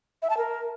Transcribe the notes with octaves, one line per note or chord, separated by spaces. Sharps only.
E5
A5
A#4